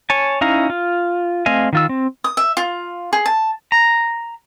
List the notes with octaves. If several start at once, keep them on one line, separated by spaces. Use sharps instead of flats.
C#5 G#5 A5
C#4 D#4 E4 F5 A#5
F4
A3 C4 D#5 F5 G#5
D#3 F4 E6
C4
D#6
E5
F4
G#4
A5
A#5